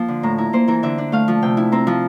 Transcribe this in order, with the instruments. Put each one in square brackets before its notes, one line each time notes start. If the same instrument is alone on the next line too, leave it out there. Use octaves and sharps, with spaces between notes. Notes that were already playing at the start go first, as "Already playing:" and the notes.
Already playing: [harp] F3 A#3 C6
D3
A2 A#5
E4 A#5
A#3 C5
E3 A#4
D3 E5
D4
A3 F5
F3
C3 G5
E4
C4 A#5
F3